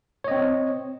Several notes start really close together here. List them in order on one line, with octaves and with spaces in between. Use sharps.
C#5 D#5 C4